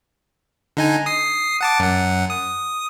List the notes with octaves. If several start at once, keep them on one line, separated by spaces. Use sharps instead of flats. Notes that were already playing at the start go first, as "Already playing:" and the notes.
D3 D#4 G#5
D#6 C7
F#5 A5 D6
F#2 F#5
D#6